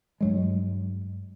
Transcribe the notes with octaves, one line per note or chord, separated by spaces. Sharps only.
G2 F#3 G#3